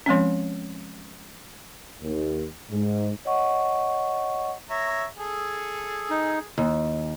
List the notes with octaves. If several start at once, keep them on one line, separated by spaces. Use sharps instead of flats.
F3 G#3 C4 C#4
D#2
G#2
C#5 D#5 F#5 C#6
C#5 E5 A#5
G#4 A4
D#4
D#2